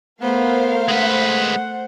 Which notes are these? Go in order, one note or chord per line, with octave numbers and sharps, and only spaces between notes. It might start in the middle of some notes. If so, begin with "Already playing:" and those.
A3 B3 A#4 C5 F5
G#3 B4 F#5